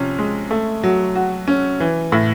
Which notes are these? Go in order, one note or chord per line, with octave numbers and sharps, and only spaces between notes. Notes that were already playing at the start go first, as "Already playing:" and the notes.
Already playing: C3 F3 C#4
G#3
A3
F#3
F#4
C#4
E3
A2